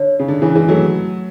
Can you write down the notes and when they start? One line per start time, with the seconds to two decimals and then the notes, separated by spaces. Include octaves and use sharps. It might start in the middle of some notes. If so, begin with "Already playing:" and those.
Already playing: D3 C#5
0.20 C#3
0.28 D3
0.42 C#3 E3
0.55 E3 G#3
0.68 F#3 A3